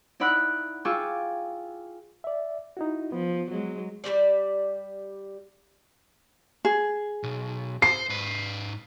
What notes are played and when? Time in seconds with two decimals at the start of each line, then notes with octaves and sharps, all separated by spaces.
0.20 D#4 E4 D5 F#5 B5 F#6
0.85 F4 G#4 G5 C#6 D6 E6
2.24 D5 E5
2.77 D#4 E4 F#4
3.12 F3 B3
3.50 F#3 G#3
4.04 G3 F#4 G4 D5
6.65 G#4
7.23 B1
7.82 C5 C7
8.09 G#2 B4